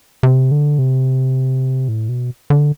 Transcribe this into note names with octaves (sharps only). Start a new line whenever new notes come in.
C3
D3
C3
A2
B2
D3